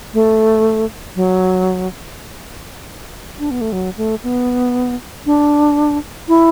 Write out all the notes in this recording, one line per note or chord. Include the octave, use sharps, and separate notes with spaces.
A3
F#3
D4
B3
A3
F#3
A3
B3
D4
E4